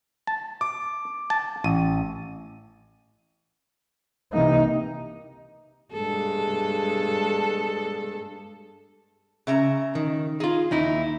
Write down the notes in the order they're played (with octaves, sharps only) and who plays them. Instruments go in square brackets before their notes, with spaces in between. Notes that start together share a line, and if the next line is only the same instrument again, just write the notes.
[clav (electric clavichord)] A5
[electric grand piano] D6
[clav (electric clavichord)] A5
[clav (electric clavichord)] A1 [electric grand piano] D#7
[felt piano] C3 E3 A#3 [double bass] D#4
[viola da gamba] G2 G#3 A4
[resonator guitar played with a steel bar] C#3 E5 A#5
[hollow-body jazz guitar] D#3
[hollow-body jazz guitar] D#4 F4 [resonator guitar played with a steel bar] G#4
[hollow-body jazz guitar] D#2 D#4 E4